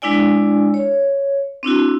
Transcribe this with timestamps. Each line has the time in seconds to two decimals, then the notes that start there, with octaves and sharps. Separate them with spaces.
0.02 G#3 D4 E4 D5 G#5
0.74 C#5
1.63 C4 D4 E4 F#4